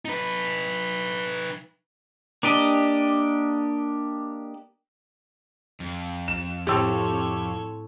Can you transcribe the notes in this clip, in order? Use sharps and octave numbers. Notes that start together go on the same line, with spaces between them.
D#4 B4
A#3 D4 G4 D#5
F2
E7
A2 C4 G4 A4 C#5 E6